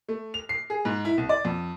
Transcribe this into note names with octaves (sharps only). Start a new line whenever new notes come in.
A3
F7
C7
G#4
G#2
E4
C2
D5
F2